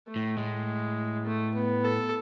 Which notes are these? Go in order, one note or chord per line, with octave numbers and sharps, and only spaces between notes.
A3
A2
A2 G#3
A3
B3
A4